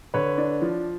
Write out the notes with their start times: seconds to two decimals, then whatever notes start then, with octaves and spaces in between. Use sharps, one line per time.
0.14 D3 B4 C#5
0.38 D4
0.62 F3